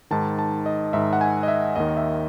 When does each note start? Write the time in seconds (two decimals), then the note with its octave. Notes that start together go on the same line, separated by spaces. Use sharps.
0.11 G#2 D#3 A5
0.39 A5
0.66 D#5
0.93 G#2 D#3 E5
1.13 F#5
1.21 G#5
1.43 D#5
1.48 E5
1.76 D#2 D#3 D#5
1.97 E5